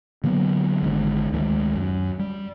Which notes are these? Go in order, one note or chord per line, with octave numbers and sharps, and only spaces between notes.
D3 F#3 A#3 B3
G#1 G#2 D3
D2 D#3 G#3
F#2
G3